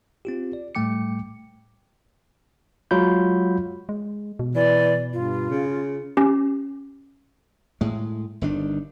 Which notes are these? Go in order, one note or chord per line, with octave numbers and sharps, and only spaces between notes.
C4 F4 G4
D5
A2 G3 A3 G5 D6 C#7
F#3 G#3 F4 B5 G6
G#3
B2
E3 D5
G2 F4
C#3
C#4 G4
A2 G#3
G1 D#3 D4